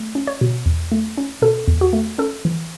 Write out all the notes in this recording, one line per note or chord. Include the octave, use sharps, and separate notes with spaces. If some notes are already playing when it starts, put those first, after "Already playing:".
Already playing: A3
C#4
C#5
B2
E2
A3
C#4
B2 A4
E2
F#4
A3
C#4 A4
E3